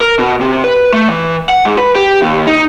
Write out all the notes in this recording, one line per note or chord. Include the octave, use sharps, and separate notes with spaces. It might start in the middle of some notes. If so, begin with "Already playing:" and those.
A#4
B2
C3
B4
A3
E3
F#5
G#2
B4
G4
D#2
D#4